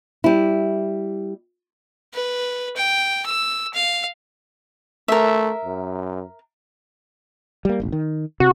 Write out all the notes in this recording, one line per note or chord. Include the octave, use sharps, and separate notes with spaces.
G3 E4
B4
G5
E6
F5
A3 A#4 E5
F#2
G3 A#3
E1 A1
D#3
C3 F#4